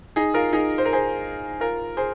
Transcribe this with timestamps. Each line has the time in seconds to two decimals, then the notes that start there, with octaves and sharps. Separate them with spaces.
0.16 D#4 G#4
0.34 F4 A#4
0.53 D#4 G#4
0.78 C5
0.86 A#4
0.93 G#4 C5
1.60 F4 A#4
1.97 G#4 C5